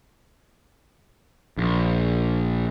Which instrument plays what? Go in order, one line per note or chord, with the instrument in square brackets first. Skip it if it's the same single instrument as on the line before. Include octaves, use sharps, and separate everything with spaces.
[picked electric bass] A#1